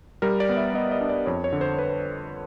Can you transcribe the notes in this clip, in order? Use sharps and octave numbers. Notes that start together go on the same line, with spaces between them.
G3 A#4
D5
B3
E5
B3 D#5
D#5
D4
D5
F2 C#5
C#5
D3
C5
B4